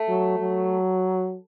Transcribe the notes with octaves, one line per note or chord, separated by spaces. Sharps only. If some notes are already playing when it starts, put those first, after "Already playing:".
Already playing: A3
F#3
F#3